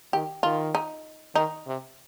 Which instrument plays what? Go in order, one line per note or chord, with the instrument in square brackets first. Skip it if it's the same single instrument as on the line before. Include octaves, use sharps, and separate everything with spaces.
[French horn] D#3 [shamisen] G4
[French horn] D#3 [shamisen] F4
[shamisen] D#4
[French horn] D#3 [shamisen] D#4
[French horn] C3